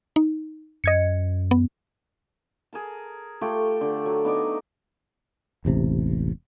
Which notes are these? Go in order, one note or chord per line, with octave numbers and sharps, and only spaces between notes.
D#4
F#2 D#5 G#6 C#7
B3
G#4 A#4 A5
A3 F4 G4 G5
D3 D5
F#3
B3 D#4 D5
E1 A1 C3